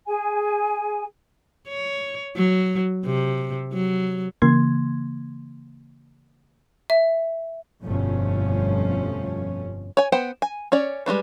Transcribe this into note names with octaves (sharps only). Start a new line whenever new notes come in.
G#4 G#5
C#5
F#3
C3
F#3
C#3 E3 A#3 C6 G#6
E5
G1 F2 B2 F3 A3 C#4
C#5 G#5
B3 C5 F#5 G5
G#5
C#4 C#5 D5
G3 G#3 D4 B4